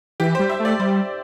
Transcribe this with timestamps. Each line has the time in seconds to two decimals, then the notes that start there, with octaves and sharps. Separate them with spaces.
0.20 E3 G4
0.35 G3 C5
0.50 E5
0.60 A3
0.65 D5
0.79 G3 C5